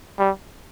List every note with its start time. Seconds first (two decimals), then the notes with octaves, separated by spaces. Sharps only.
0.19 G3